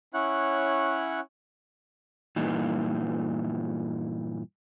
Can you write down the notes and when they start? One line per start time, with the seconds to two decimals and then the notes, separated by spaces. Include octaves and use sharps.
0.14 C#4 E4 C#5 F#5 F#6
2.36 G2 A#2 E3 D#4